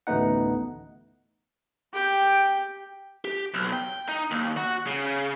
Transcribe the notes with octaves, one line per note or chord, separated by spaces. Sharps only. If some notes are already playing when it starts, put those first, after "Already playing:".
A1 D2 A3 B3 D#4 F#5
G4 G5
G4
B1
G5
D#4
D#2
F#4
C#3